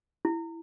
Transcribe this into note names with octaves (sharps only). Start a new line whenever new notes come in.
E4